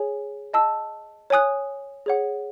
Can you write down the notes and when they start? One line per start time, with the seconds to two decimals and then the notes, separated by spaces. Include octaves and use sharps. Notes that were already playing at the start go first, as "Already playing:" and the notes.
Already playing: G#4 C#5 G#5
0.53 D#5 A5 E6
1.30 C#5 G#5 D#6 F#6
2.06 G#4 C#5 F#5